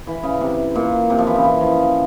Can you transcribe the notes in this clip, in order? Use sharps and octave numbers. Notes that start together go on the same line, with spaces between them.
E3
C#3
C3
A#2
C3
F3
E3
C#3
E3
F3